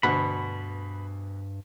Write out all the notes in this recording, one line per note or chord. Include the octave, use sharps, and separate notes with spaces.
D2 G2 B2 F#5 B5